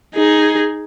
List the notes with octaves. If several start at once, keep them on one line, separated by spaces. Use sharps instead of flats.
D#4 G#4